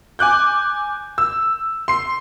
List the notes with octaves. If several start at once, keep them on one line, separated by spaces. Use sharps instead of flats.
G#5 D6 F#6 G6
E6
C6 C7